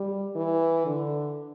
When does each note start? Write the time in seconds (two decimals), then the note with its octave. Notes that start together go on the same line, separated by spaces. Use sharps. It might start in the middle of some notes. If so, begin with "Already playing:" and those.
Already playing: G3
0.35 E3
0.86 D3